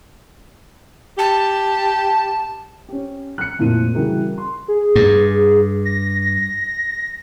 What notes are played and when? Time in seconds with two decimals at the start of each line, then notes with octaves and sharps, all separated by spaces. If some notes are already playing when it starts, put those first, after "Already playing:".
1.18 G4 A5
2.89 C#4 G4
3.38 F#6 C#7
3.59 F1 F2 A#2 E4 A#4 D#7
3.95 C#3 E3 G3 F#4 G#4 A#4
4.38 C6
4.68 G#4
4.96 G2
5.85 A#6